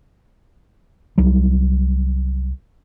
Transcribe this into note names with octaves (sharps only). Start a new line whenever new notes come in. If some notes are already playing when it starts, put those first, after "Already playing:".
C2 F#3 G3